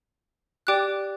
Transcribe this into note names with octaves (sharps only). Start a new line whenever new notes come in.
G4 D5 G5 D6 F#6